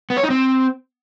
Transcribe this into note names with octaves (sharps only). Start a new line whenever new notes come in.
B3
C#5
D#4
C4